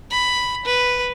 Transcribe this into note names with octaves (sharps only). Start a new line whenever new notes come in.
B5
B4